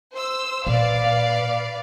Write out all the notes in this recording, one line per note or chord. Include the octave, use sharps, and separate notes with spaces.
C5 E6
A#2 B4 D5 F5